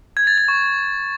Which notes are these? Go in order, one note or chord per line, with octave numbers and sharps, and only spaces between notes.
G#6
A6
G#6
C#6